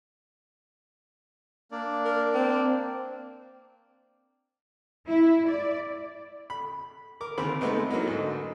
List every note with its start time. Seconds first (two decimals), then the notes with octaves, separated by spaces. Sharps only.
1.72 A#3 D4 D5
2.05 A#4
2.34 C4
5.07 E4
5.48 D5
6.50 B5
7.21 A#4 D6
7.38 D#2 C#3 C4 A#4 B5
7.61 G#3 A3 B3 C4 D#4
7.89 F#3 A#3 B3 D#4 E4
8.07 G#2 D3